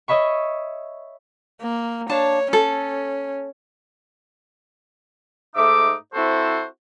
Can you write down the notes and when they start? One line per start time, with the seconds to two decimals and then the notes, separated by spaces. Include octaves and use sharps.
0.08 C#5 D#5 E5 B5 C#6
1.61 A#3
2.09 D4 C#5 F5 A5
2.53 C#4 A4
5.56 G#2 A3 D#4 E5 D6
6.14 C4 E4 F#4 A4 C5